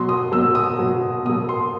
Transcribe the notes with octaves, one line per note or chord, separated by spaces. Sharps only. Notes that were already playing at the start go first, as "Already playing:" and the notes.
Already playing: B2 F#3 C6
D#6
B2 F#3 E6
D#6
B2 F#3
B2 F#3 D#6
C6